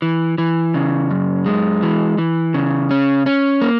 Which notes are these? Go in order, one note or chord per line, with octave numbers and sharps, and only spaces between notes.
E3
E3
C#3
F#2
G#3
E3
E3
C#3
C#4
C#4
A#3